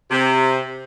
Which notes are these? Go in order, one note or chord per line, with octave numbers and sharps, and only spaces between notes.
C3